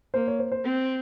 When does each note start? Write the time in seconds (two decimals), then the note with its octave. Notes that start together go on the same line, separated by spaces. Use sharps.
0.14 A#3 C5
0.27 C#5
0.39 C5
0.52 C5
0.64 C4